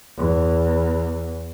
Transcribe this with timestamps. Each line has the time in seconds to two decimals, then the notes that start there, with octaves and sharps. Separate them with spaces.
0.18 E2